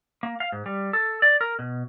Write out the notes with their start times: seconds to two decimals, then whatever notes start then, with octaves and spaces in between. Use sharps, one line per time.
0.23 A#3
0.40 F5
0.52 G#2
0.66 G3
0.93 A4
1.22 D5
1.41 A#4
1.59 B2